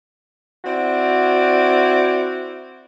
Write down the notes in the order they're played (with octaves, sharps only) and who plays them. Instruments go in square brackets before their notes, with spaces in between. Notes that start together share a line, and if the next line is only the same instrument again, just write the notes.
[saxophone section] C4 E4 F#4 D5